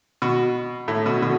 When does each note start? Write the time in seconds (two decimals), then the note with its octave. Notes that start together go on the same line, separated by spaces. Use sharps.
0.22 B2
0.88 A2
1.06 B2
1.22 B2 D3